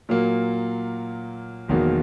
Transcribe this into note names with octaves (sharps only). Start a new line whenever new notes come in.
A#2 F#3 A#3
E1 E2 D#3 F#3 A#3